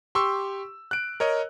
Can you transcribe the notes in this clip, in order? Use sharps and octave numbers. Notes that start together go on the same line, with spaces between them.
G4 C6 C#6 E6
F#6 D7
A#4 C#5 D#5